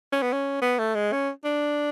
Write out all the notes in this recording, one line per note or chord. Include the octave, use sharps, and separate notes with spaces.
C#4
B3
C#4
B3
A3
G#3
C#4
D4